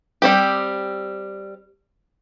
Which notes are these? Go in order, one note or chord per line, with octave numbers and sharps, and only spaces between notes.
G3 C4 G4